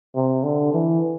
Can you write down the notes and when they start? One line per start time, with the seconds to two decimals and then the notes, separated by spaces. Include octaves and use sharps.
0.15 C3
0.44 D3
0.74 E3